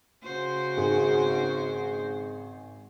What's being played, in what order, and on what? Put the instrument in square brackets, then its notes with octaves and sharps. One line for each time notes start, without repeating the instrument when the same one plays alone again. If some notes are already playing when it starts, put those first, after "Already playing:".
[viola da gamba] C#3 F#4 C5
[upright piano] G#1 G#4